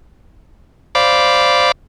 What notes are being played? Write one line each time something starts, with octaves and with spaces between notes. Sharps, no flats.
C5 D5 F5 B5 D6